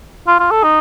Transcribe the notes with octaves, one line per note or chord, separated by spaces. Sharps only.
F4
F4
A4
D#4